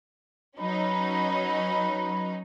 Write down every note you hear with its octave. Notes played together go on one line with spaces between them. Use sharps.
F#3 C#4 D#4 B4 B5